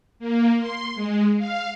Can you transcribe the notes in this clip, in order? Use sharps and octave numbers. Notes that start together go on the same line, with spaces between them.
A#3
C6
G#3
F5